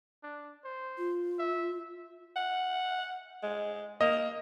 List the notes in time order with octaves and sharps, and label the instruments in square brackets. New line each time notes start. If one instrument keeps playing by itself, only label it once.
[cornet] D4
C5
[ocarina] F4
[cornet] E5
[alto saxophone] F#5
G#3
[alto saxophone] A#3 [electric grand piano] D#5